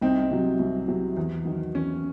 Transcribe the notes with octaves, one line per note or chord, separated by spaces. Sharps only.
C2 C4 D#4
C3 F#3
C2
C3 F#3
E2
D#3 F#3
E2 C#4